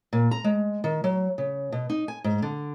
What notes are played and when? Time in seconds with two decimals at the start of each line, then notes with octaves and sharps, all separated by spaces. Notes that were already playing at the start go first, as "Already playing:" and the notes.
0.13 A#2
0.31 A#5
0.44 G#3
0.84 D#3
1.04 F#3
1.38 C#3
1.72 B2
1.90 D#4
2.08 G#5
2.24 G#2
2.42 D3